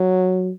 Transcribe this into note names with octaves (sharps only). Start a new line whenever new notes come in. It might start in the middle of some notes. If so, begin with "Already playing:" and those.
Already playing: F#3